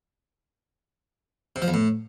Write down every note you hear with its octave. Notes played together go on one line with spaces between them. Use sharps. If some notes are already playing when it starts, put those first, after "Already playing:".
C3
F3
E2
A2